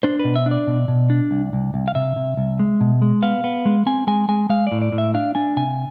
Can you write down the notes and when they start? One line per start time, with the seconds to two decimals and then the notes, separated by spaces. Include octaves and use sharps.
0.03 D4 C5
0.19 B4
0.25 B2
0.36 E5
0.46 D4
0.51 D5
0.67 B2
0.88 B2
1.10 D4
1.31 C2
1.53 C2
1.74 C2
1.88 F5
1.95 C3 E5
2.16 C3
2.37 C2
2.59 G#3
2.81 B2
3.02 G#3
3.22 B3 F5
3.44 B3
3.66 G#3
3.86 C4 G#5
4.07 G#3 G#5
4.29 G#3 G#5
4.49 G#3 F5
4.67 A2 D5
4.82 D5
4.92 A2
4.98 E5
5.14 D4 F5
5.35 D4 G#5
5.57 C3 G#5